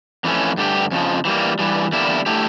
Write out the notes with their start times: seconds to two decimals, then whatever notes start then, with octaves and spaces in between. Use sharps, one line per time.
0.24 F2 E3 A3 C#4
0.57 G2 D3 A3 D4 G4
0.91 F2 C#3 F3
1.25 E3 G3 A#3
1.59 G2 E3 G3
1.92 E2 D3 G3 A#3 E4
2.26 D3 A3 E4 G4